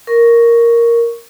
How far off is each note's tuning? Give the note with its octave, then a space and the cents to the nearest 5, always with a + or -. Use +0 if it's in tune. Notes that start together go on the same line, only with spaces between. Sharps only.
A#4 +0 C#6 +0